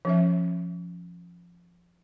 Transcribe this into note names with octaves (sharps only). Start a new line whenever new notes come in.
F3 C#4 E5